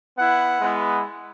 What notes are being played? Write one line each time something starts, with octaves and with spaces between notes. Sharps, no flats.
B3 E4 F#5
G#3 B3 E4